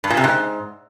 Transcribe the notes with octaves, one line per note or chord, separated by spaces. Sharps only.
G2
A#2
C3
G#2